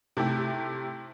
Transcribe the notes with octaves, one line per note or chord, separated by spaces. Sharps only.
C3 A3 E4 G4